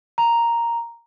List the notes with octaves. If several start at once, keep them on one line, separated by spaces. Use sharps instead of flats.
A#5